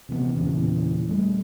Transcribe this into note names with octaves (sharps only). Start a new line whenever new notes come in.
C3 E3 A3 B3
E2 A#2 C#3 E3
G3 A3